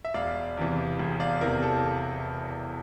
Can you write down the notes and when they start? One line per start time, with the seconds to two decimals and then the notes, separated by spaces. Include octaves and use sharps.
0.05 E5
0.14 E1 D5 F5
0.57 E2 C3 E3
0.99 E1
1.20 D5 F5
1.41 E2 C3 E3 A#4
1.63 A4